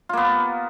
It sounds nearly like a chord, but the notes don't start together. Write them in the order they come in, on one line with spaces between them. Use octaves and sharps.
F4 A#3 B3